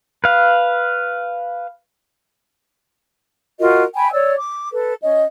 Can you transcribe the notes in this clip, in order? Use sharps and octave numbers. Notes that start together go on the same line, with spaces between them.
B4 F5
F4 F#4 A#4 D#5
G5 G#5 B5
C#5 D5 E6
D6
A4 B4
C#4 D#5